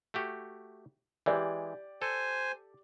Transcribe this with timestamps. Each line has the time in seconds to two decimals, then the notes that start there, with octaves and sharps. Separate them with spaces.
0.14 A3 F#4 G4
1.26 E3 G#3 G4 D5 G6
2.02 A4 C5 G#5